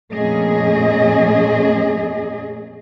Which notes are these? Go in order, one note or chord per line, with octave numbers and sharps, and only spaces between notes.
F2 A#2 A3 C#4 G#4 D#5